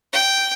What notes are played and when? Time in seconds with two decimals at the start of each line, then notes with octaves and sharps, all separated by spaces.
0.13 G5